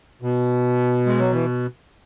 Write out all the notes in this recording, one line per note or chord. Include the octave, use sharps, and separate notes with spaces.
B2
G#3
F#3
E3